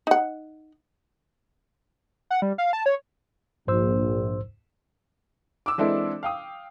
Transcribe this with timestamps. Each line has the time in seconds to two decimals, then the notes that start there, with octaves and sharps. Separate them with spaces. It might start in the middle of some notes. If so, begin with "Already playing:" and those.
0.07 D#4 F#5
2.30 F#5
2.42 G3
2.58 F5
2.73 A5
2.86 C#5
3.68 A#1 G#2 C5 E6
5.66 D6 E6
5.78 E3 G#3 C4 D4 E4 A4
6.23 F5 G5 D#6